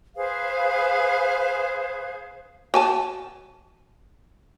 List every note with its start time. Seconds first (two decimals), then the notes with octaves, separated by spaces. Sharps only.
0.15 G#4 B4 C5 F5
2.74 F#4 G#5 A5